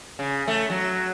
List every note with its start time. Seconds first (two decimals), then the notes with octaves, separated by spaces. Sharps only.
0.19 C#3
0.48 A3
0.70 F#3